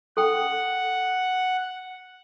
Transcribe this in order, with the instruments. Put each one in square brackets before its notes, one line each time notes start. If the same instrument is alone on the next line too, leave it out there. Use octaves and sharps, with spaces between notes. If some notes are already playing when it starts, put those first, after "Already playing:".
[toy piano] A4 G5 [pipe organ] F#5